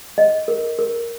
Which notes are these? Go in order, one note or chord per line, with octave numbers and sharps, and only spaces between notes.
D#5
A#4
A#4